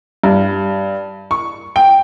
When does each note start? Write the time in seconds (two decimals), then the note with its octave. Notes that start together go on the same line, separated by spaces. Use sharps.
0.24 G2
1.31 C#6
1.76 G5